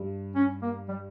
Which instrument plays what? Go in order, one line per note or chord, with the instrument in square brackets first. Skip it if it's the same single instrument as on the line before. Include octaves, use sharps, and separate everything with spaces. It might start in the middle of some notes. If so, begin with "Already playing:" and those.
Already playing: [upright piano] G2
[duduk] C#4
A#3
G3